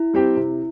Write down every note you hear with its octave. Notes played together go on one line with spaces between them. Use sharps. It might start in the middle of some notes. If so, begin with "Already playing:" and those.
Already playing: E4
G3 C4 G4
C3